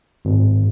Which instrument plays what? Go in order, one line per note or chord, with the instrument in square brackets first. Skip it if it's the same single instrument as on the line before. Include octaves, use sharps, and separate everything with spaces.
[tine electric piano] G#1